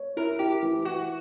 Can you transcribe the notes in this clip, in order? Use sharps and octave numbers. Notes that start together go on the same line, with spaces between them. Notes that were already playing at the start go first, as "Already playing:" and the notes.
Already playing: C#5
E4 A#4
E4 G4
E3
E3 F#4